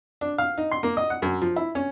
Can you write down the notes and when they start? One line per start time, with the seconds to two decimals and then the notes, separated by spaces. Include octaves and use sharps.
0.21 D4
0.38 F5
0.58 D#4
0.71 C6
0.83 A#3
0.97 D#5
1.10 F#5
1.22 F#2
1.42 F3
1.56 E4
1.75 C#4